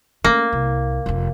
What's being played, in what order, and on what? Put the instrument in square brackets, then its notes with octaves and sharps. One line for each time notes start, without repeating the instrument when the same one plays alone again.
[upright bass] A3 C#4 [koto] A#3
[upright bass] C2
F1 F2